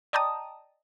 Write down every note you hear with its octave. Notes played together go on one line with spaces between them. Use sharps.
D5 D#5 G5 A5 A#5 D#6